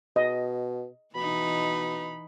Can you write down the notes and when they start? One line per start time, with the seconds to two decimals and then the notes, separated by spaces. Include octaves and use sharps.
0.16 B2 D#5
1.15 B2 E3 D#4 B5